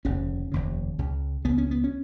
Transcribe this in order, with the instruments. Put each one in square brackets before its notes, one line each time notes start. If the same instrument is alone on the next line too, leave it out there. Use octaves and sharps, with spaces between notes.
[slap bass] F1 D#2 C#3 C#4
F1 D#2 C#3
C#2 C#3
C#2 C#3 B3
C#4
B3
C#4